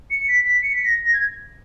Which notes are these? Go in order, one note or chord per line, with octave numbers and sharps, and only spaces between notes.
C#7
B6
B6
C#7
B6
A#6
A#6
G#6